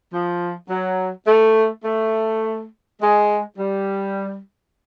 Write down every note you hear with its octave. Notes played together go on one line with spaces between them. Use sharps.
F3
F#3
A3
A3
G#3
G3